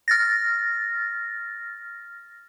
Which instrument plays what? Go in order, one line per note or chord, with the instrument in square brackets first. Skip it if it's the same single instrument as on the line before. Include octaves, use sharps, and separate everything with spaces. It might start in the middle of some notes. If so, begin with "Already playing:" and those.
[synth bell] F6 A6 A#6